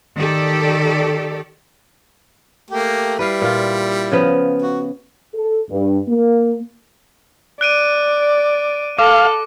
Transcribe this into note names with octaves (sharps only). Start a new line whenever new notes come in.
D#3 G4 A4 D5
A3 A#3 G4
G3 E4 B4 F5
A#2 F4
C#3 F3 B3
F#4
A4
G2
A#3
D5 F#6 D7 D#7
A4 F5 D6